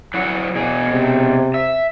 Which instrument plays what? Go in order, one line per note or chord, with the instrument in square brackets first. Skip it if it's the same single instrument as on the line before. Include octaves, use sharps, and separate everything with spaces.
[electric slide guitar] F#3 E4 F#5
B2 G#4
[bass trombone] C3
[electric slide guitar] E5